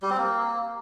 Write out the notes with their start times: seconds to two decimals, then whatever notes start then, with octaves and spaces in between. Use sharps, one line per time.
0.02 G3
0.10 C4
0.18 A#3